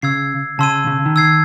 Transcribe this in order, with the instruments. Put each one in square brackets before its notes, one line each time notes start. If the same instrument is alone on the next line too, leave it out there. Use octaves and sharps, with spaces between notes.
[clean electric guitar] C#3 [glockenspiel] E6 G#6 C7
[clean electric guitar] C#3 [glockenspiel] A5 C6 E6 G#6 D#7
[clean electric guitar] C#3
D#3
[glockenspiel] E6 G#6 C7